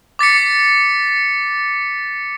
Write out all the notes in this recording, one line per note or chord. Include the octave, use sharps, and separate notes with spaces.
D6 A6 B6 C#7